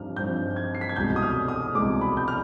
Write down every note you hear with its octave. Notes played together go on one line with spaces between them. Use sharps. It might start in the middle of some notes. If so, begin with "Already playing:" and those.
Already playing: G2 F3 C4 D#4 F6
G2 F3 C4 D#4 G6
G#6
C7
B6
G#6
C2 B2 G#3 G6
D#6
F6
D#6
C2 B2 G#3 D6
B5
G6
F6